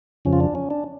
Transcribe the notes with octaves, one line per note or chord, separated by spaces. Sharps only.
F2 C#3 F3 C#4
F4
D4
C#4
D4